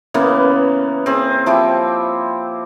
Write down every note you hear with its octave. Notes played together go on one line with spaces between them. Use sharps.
C#3 E3 A#3 B3
C4 G#4
F3 E4 G4 G5